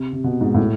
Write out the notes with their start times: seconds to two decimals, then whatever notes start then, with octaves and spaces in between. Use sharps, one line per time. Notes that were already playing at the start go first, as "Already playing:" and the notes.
Already playing: C3
0.13 C3
0.24 B2
0.41 G#2
0.54 A2